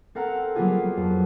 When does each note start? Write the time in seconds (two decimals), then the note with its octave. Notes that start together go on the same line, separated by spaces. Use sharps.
0.15 C4 A4 A#4 F#5 A#5
0.55 F#3 G3 A#3 B3 F4 G#4
0.97 F2